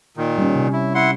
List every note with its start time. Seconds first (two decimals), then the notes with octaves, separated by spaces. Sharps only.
0.17 A#2 D#3
0.38 G3 C#4
0.56 C3
0.73 E4
0.95 E4 F#5 C6